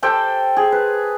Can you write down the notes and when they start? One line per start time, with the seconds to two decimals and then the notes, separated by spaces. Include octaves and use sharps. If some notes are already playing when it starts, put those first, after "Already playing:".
0.02 G4 A4 C5 G5
0.57 G#4
0.72 B4